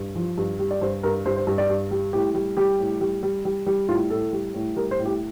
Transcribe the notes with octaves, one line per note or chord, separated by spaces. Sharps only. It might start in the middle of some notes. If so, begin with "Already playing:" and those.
Already playing: G2
F3
G2
G3
D5
G2 C5
G2 A#4
G2 C5
C5
G2
D5
G2
G3
A2 G4
G3
G3 G4
A2
G3
G3
G3
G3
A2 F4
A2 A4
G3
A2
G3 A#4
C5
A2
G4